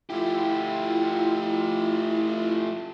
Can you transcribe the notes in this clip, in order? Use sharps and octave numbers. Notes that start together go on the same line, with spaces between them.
A3 E4 F4 G4